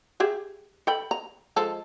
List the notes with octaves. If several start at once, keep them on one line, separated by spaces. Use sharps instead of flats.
G4 G#4 E5
A4 G5 B5
A#5
F3 G#3 A4